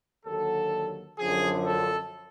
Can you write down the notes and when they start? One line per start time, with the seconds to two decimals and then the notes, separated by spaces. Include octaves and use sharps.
0.26 D#2 D3 F#3 A4
1.19 F#2 D3 F3 G#4
1.66 A4